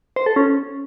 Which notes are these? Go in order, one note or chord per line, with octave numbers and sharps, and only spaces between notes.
C5
A4
C#4